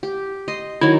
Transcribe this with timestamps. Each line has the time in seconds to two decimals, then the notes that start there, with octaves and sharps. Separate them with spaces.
0.03 G4
0.48 D#5 C6
0.81 D#3 F#3 E4